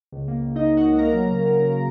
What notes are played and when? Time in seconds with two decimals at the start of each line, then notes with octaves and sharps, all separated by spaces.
0.12 C#2
0.28 A#3
0.42 C#2
0.56 C#2 D#4 D#5
0.70 C#2
0.77 F#4 F#5
0.85 C#2
0.98 A#3 A#4 A#5
1.13 F#3
1.27 C#3
1.42 F#3
1.56 C#3